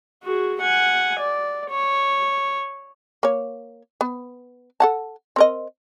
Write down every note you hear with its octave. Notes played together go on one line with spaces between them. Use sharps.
F#4 G#4
F#5 G#5
D5
C#5
A#3 C#5
B3
A4 F#5 A5
C4 A#4 D#5